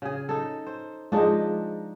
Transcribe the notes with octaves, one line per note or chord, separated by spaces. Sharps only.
C#3 G#4
D#4 A4
C5
F3 G#3 D4 D#4 G#4 D#5